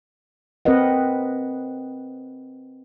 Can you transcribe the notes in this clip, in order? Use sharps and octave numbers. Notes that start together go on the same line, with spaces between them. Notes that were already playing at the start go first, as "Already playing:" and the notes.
C4 A#4 B4 D#5 F#5